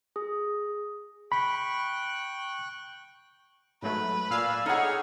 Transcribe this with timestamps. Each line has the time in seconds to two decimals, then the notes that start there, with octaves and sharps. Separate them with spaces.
0.16 G#4
1.32 G5 B5 C#6 F#6
3.82 G#2 F#3 A3 B4
4.31 A#2 D5 F5 G#5 E6
4.66 D#4 G#4 A4 C#5 F#5 F6